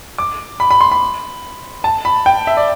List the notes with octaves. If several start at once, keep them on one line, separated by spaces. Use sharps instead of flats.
D6
B5
B5
C6
B5
A5
B5
G5
E5
D5